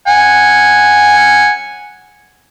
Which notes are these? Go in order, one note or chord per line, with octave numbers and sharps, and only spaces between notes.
F#5 G#5